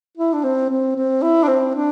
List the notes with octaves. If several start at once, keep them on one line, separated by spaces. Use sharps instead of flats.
E4
D4
C4
C4
C4
E4
D4
C4
D4